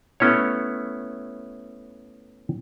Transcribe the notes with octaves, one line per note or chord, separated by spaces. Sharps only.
A3 B3 C#4 E4 C#5